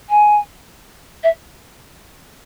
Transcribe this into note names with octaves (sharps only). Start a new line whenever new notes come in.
G#5
E5